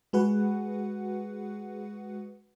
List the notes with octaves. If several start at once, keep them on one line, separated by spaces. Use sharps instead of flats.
G#3 F#4 G#4 B4 F#5